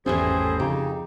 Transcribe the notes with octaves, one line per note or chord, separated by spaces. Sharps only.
G#1 E2 A2 E3 G3 C#4 G#4 C5
F2 C#3 D#4 G4